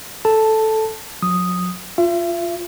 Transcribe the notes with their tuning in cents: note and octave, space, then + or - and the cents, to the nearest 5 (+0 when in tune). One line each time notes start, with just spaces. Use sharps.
A4 -5 A5 +0
F#3 -40 D#6 +0
F4 +0 E5 +40